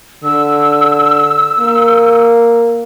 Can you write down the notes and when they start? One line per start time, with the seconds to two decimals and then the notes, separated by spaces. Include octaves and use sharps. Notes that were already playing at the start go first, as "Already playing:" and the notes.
0.24 D3 E6
1.60 A#3